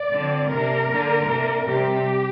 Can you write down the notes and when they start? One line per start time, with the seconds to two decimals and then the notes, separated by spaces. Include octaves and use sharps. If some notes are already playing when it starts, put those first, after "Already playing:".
Already playing: D5
0.12 D3 F3 C4
0.51 C3 A#3 D4 A#4
0.91 D3 A#3 D4
1.29 C3 A#3 D4
1.67 C3 G3 C4 G4